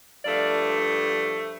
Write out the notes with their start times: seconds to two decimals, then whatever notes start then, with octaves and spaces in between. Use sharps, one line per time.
0.24 G2 F3 A3 D5 F5